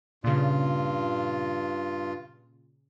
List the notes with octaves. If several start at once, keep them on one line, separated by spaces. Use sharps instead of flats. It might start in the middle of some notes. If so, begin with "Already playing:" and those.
G2 A#2 C#3 F4